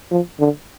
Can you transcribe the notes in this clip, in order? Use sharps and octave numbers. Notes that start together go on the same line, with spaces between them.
F3
D3